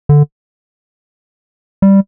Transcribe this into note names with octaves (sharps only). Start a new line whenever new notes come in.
D3
G3